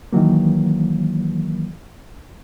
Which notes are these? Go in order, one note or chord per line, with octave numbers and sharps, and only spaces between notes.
D#3 E3 F#3 A#3